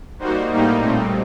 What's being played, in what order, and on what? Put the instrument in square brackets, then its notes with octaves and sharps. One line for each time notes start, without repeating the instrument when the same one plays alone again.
[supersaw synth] G3 A#3 D#4 F#4 C5
A2 G3 A#3 D#4
A#2 A3 C4